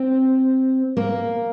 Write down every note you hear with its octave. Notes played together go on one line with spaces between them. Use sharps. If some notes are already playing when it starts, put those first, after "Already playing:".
Already playing: C4
A#3